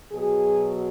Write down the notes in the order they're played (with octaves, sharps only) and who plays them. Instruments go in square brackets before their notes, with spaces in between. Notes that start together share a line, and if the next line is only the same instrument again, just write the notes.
[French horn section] B2 F#3 G#4